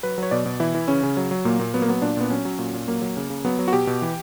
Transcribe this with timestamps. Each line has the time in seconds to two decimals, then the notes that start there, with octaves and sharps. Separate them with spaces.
0.03 F#3 B4
0.18 F#3 C#5
0.31 B2 D5
0.46 B2
0.60 E3 E4
0.75 E3
0.88 C#3 C#4
1.03 C#3
1.17 F#3
1.31 F#3
1.45 A#2 A#3
1.60 A#2
1.74 F#3 B3
1.82 A#3
1.88 F#3 B3
2.02 A#2 D4
2.17 A#2 B3
2.30 F#3 C#4
2.45 F#3
2.59 A#2
2.73 A#2
2.88 F#3 A#3
3.02 F#3
3.17 C#3
3.30 C#3
3.45 F#3 B3
3.59 F#3
3.68 F#4
3.73 B2 G4
3.87 B2
4.02 E3